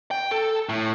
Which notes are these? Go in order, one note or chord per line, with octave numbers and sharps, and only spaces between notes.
G5
A4
A2